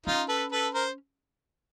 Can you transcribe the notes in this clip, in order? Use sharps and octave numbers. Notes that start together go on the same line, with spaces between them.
C#4 D#4 F4
A4 B4
A4 B4
A#4 C5